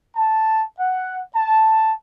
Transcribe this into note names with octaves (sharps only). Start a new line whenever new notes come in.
A5
F#5
A5